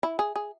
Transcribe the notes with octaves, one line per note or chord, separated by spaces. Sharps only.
E4
G#4
G#4